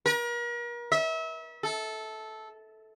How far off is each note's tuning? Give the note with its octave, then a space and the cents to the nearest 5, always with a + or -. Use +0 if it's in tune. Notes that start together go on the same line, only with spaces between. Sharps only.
A#4 +40
E5 -30
A4 -10